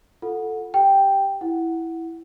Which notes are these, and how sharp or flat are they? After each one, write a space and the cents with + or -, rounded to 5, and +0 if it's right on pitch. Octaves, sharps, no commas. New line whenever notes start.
F4 +0 A4 +0 F#5 -15
G4 +0 G5 +0
E4 +0 F#5 +0